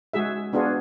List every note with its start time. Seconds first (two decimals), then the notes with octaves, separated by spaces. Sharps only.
0.13 G#3 F#4 G#4 E5
0.53 B3 D4 F4 F#4 G#4